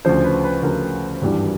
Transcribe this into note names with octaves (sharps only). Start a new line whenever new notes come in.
D2 C#3 F3 C5
B4
B4
D2 C#3 F3 A#4
G#1 G2 E3 G3